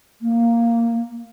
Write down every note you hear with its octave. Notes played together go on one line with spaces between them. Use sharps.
A#3